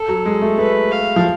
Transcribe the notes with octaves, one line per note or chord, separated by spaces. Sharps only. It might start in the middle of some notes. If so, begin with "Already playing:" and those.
Already playing: A4
F#3
G#3
A3
A3 B4
F5
F3